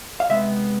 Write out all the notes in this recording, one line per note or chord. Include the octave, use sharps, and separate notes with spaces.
F5
C3 G#3 B3 E5